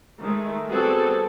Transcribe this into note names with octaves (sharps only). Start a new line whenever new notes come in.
D#3 G#3 A3
G3 B3 C4 F#4 G#4 A4